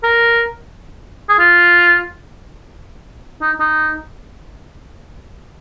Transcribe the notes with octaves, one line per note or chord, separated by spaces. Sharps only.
A#4
G#4
F4
D#4
D#4